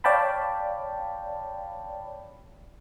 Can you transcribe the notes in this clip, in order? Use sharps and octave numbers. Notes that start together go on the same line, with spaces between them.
C#5 D5 F5 G5 A5 B5